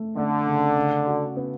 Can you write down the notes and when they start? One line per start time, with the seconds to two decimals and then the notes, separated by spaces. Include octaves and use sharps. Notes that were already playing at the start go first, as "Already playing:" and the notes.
Already playing: A3
0.16 D3 A3
0.47 C#3
0.76 C#3
1.07 F#4
1.37 B3